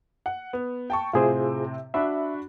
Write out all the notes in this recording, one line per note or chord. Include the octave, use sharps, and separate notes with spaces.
F#5
B3
G5 A5 C#6
A2 C3 C4 F4 G#4 C5
D4 F#4 E5 B5